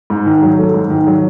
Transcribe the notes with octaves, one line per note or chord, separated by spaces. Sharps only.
G#2
D#3
F#3
A3
G#2
D#3
F#3